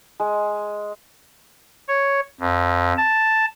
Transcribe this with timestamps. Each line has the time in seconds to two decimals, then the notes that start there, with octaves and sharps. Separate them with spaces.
0.20 G#3
1.88 C#5
2.40 F2
2.98 A5